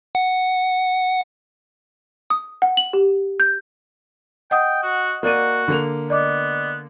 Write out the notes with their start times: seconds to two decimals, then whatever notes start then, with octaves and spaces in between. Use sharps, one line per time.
0.15 F#5
2.30 D#6
2.62 F#5
2.77 F#7
2.93 G4
3.40 G6
4.51 D#5 F#5 G5 D#6
4.83 F#4
5.23 A#3 F#4 D5 D#7
5.68 D3 A#3 F7
6.10 B3 D5 D#5 D6